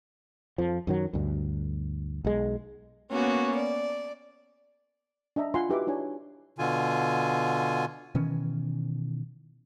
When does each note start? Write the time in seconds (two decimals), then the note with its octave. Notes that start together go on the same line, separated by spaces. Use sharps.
0.58 F2 F3
0.87 F#2 D#3 F#3
1.13 D2 G2
2.25 B1 G#3
3.11 A#3 B3 C#4 F#4
3.56 D5
5.36 D4 D#5 E5 A#5
5.54 F4 F5 F#5 G#5 B5 C6
5.70 D#4 F#4 G4 B4 E5 D6
5.87 D4 E4 C#5 G#5
6.59 B2 D3 F4 G#5
8.15 B2 D#3 E3 C#4